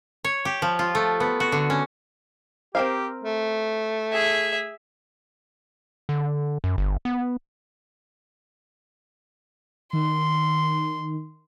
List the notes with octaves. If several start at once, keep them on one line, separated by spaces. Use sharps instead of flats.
C#5
G4
F3
F4
A3
B3
F#4
D3
C#4
C4 G4 A#4 F5
A3
G#4 E5
D3
F#2
G1
B3
D#3 C6